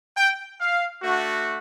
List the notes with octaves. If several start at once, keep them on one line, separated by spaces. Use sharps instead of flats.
G5
F5
A3 D4 F#4